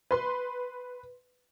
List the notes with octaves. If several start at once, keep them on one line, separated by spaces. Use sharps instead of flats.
B4 C6